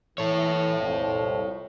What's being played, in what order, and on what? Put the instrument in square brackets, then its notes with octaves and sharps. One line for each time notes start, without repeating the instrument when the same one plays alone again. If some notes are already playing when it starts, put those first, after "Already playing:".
[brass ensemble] E3 [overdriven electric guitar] A4 C#5
[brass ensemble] C2 F2